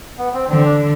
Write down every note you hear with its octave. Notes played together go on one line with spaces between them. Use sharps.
B3
C4
D3 C4
D4